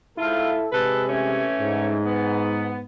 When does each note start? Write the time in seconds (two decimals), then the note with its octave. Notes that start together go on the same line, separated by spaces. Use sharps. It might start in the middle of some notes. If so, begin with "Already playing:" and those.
0.18 G#2 E4 F4 A4
0.72 C3 G#3 G#4 A4 B4
1.09 E3 A3 C#4
1.61 G#2
2.04 B3